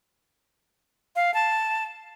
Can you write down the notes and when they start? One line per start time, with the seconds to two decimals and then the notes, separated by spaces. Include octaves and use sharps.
1.16 F5
1.34 A5